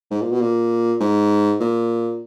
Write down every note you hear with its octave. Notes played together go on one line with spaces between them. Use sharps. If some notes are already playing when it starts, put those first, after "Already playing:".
G#2
A#2
B2
A#2
G#2
A#2